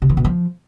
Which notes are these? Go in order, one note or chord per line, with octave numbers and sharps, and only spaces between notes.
C3
E3
B2
F3